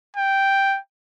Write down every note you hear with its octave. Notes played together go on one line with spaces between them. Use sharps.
G5